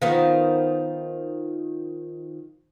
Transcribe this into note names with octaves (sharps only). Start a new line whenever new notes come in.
D#3 F3 B3